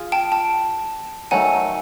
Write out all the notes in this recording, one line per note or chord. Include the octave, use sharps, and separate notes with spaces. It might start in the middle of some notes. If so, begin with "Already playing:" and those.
Already playing: F4 G#4
G5 A5
G5 A5
D#3 F#3 A3 F#5 G#5